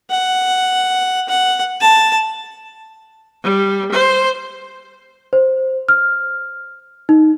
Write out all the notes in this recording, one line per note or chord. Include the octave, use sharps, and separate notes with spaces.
F#5
F#5
A5
G3
C5
C5
F6
D#4